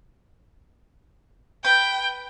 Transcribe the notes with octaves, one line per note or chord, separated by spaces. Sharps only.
B4 G5 G6